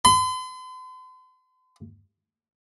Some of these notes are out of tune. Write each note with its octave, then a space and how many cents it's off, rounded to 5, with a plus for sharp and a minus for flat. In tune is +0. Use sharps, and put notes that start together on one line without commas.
C6 -45